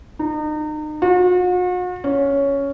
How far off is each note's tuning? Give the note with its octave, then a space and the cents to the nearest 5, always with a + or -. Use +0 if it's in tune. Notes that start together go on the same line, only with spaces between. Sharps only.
D#4 -35
F#4 -45
C#4 +5